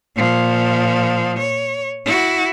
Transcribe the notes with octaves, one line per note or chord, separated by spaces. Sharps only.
A#2 F3
C#5
E4 F#4